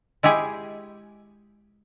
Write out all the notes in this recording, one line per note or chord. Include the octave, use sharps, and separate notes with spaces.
G#3 E4 G4 G#4